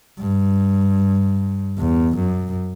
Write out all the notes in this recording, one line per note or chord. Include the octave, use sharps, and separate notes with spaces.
G2
E2
F#2